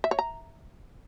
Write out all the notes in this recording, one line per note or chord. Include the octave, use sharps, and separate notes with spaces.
E5
C#5
A#5